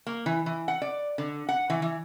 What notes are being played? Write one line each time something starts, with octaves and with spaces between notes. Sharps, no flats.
A#3
E3
E3
F#5
D5
D3
F#5
E3
E3